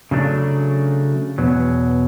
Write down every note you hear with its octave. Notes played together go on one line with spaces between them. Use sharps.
C#3 F#3 A3 D4
E2 B2 F#3